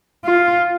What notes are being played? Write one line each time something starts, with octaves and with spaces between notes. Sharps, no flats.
F4